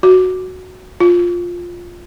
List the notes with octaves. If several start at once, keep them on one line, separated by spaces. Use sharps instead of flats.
F#4
F4